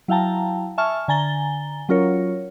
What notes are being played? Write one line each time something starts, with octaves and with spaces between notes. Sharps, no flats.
F#3 E4 F5 G5 A5 A#5
E5 G#5 A5 C#6 F6
D3 G#5 A#5 A6 G7
F#3 C#4 F4 A#4 C#5